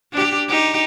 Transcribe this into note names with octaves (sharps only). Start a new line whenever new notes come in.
D4 G4
D#4 G4